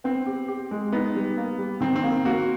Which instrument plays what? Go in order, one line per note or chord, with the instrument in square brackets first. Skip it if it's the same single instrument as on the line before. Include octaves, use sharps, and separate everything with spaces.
[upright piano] B3 [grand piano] C4
[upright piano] G4
G4
G#3
[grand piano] B3 [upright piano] D#4
[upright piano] G3
A#3
G3
[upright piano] D#3 [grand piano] C4
[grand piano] C4
[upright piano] A#3
[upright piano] A#3 [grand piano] F#4